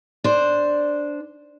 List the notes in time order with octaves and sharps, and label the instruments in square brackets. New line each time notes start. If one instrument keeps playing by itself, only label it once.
[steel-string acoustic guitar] D4 C5